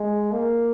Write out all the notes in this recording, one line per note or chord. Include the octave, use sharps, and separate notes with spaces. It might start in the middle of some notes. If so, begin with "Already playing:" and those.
Already playing: G#3
A#3